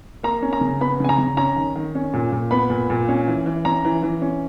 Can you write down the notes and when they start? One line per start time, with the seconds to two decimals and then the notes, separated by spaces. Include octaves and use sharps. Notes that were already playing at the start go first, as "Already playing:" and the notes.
0.23 A#3 A#5
0.42 C#4
0.53 A#5
0.61 C#3
0.81 B3 B5
1.00 C#3 G#5
1.09 A#5
1.18 C#3
1.37 C#4 A#5
1.56 D#3
1.76 D#3
1.95 C#4
2.14 A#2
2.32 A#2
2.51 B3 B5
2.70 A#2
2.90 A#2
3.09 C#4
3.28 E3
3.46 E3
3.65 C#4 A#5
3.85 E3
4.03 E3
4.22 C#4